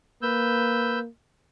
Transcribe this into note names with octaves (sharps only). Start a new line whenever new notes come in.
A#3 B4 E6 G6